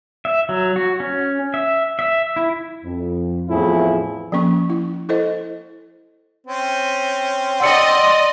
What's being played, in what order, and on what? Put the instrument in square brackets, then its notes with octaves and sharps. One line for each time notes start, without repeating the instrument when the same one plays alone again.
[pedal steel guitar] E5
F#3
F#4
C#4
E5
E5
E4
[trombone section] F2
E2 A2 F3 C4 E4 G#4
[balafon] F3 A#3 C#4 C#6
E4
E4 A4 C5 D#5
[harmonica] C4 C#4
[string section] D5 D#5 [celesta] F#5 E6 C#7 [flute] C6